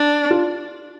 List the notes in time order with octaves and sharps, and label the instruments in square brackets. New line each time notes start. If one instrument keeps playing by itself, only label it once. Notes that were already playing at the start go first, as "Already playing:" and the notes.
Already playing: [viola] D4
[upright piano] F4